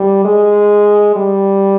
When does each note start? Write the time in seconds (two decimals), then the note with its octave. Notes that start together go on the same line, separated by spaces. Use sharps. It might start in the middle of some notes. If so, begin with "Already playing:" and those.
Already playing: G3
0.25 G#3
1.16 G3